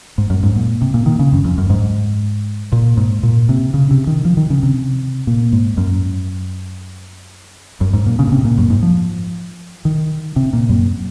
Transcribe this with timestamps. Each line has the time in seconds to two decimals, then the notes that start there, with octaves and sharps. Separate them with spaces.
0.18 G#2
0.30 F#2
0.43 G#2
0.56 A#2
0.82 C3
0.94 A#2
1.06 D#3
1.19 C#3
1.32 F#2
1.45 F2
1.58 F#2
1.70 G#2
2.72 A#2
2.97 G#2
3.23 A#2
3.49 C3
3.74 C#3
3.91 C3
4.07 D#3
4.25 F3
4.37 D#3
4.50 C#3
4.63 C3
5.27 A#2
5.53 G#2
5.77 F#2
7.81 F#2
7.93 G#2
8.06 A#2
8.19 C#3
8.27 A#2
8.32 C3
8.45 A#2
8.58 F#2
8.70 G#2
8.83 F3
9.85 D#3
10.36 C3
10.53 A#2
10.69 F#2